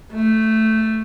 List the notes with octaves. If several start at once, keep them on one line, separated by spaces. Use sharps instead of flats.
A3